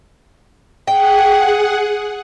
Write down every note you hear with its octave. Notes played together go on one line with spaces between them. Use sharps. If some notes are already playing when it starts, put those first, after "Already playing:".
G#4 F#5 G5